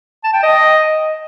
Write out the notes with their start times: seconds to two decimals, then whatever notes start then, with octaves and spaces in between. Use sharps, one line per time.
0.24 A5
0.33 G5
0.43 D#5